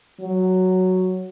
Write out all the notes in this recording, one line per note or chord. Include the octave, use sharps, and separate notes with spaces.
F#3